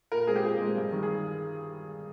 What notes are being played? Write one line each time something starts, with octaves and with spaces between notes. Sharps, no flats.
A#2 A#4
G#3 C4 G#4
G4
A#2 G#4
G#3 C4
G2
D#3 G3
G#4